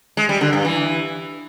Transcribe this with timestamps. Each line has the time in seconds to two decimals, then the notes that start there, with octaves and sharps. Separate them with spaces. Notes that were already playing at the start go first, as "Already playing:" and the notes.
0.17 G#3
0.29 G3
0.41 D3
0.53 G2
0.65 E3